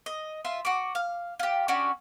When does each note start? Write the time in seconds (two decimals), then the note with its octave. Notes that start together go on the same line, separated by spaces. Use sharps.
0.06 D#5
0.45 F4 E5 C6
0.65 F#4 D6
0.95 F5
1.39 F4 G4
1.68 C#4 D4 F#4 G4